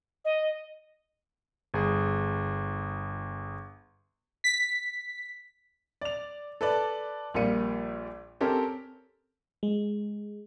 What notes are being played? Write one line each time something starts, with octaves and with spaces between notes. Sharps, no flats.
D#5
G1 G#4
B6
D5 F7
A4 B4 D5
A#1 A#2 G3 A#3 C#7 D#7
C4 C#4 G4 A4 A#4
G#3